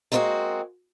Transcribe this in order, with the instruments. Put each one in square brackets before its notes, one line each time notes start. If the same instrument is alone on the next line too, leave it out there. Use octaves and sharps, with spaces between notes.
[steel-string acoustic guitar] G#3 A#3 C4 C#4 F#4 G#4